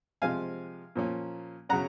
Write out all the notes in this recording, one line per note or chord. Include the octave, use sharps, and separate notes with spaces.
C3 F3 G#3 F5 G#5
A#2 F3 A#3 C#4
C#3 F#3 C#4 F#5 A#5